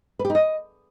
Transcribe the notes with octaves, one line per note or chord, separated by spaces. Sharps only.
B4
G4
D#4
D#5